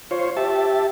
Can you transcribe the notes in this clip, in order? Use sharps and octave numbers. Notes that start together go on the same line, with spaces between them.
F4 C5 C#5
G4 E5 A5